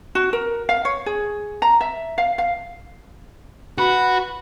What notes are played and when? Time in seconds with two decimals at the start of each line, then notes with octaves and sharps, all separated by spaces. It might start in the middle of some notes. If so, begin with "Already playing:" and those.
0.15 F#4
0.33 A#4
0.69 F5
0.85 C#5
1.06 G#4
1.62 A#5
1.81 E5
2.18 F5
2.38 F5
3.78 F#4 B4